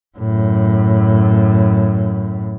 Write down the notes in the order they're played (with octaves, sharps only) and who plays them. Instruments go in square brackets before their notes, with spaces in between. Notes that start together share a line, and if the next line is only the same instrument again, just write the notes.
[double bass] F#2 A2